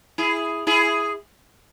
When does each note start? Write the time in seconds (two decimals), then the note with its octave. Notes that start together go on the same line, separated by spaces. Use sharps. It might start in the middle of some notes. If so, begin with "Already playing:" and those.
0.18 E4 G#4
0.67 E4 G#4